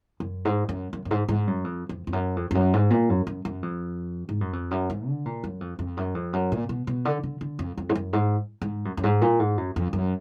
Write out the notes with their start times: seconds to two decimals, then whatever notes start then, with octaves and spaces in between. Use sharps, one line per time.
0.20 F#2
0.45 G#2
0.69 F#2
0.93 F#2
1.05 F#2
1.11 G#2
1.29 G#2
1.47 F#2
1.64 F2
1.89 F2
2.07 F2
2.13 F#2
2.36 F2
2.51 F2
2.55 F#2
2.73 G#2
2.91 A#2
3.09 F#2
3.27 F#2
3.45 F#2
3.63 F2
4.29 G#2
4.41 F#2
4.53 F2
4.71 F#2
4.90 G#2
5.07 D3
5.25 A#2
5.44 F#2
5.61 F2
5.79 F2
5.97 F#2
6.15 F2
6.33 F#2
6.52 A#2
6.69 B2
6.87 B2
7.05 D3
7.23 D3
7.41 D3
7.59 F2
7.78 F2
7.89 G#2
7.95 F#2
8.13 G#2
8.62 G#2
8.85 F#2
8.97 F#2
9.04 G#2
9.22 A#2
9.39 G#2
9.57 F#2
9.76 F2
9.93 F#2